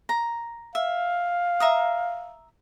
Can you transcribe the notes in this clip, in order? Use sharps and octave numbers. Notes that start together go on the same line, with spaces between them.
A#5
E5 F5
E5 A#5 D#6